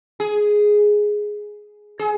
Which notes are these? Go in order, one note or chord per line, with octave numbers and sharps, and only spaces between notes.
G#4
G#4